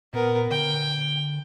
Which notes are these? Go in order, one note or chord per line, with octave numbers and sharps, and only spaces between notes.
A#2 B3 A#4
D3 G5